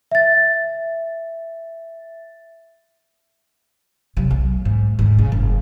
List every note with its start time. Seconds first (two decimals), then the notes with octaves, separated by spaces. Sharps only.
0.11 E5 A6
4.17 C3 F#3
4.30 B1
4.65 G#2
4.99 G#2 D3
5.19 C#3
5.32 F#1